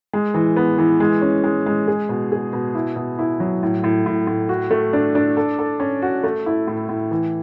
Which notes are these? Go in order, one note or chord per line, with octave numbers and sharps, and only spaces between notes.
G#3
E3
B3
E3
G#3
C#4
G#3
G#3
G#4
B2
G#4
B2
E4
B2
E4
F#3
A2
A2
A2
A2
F#4
A3
D4
D4
A4
A4
C#4
F#4
A3
E4
A2
A2
E3